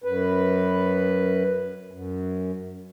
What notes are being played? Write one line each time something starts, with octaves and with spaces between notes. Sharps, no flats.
F#2 B4
F#2